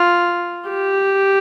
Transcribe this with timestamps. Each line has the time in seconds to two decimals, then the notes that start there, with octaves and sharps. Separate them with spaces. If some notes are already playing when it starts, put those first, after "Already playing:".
Already playing: F4
0.69 G4